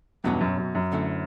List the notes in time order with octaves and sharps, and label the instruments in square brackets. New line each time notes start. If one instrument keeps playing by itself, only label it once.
[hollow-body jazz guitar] B1 B2 F#3 C#4 F#4 [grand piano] E2 G2
[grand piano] F#2
F#2
F#2
[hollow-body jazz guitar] D2 D3 A3 C#4 E4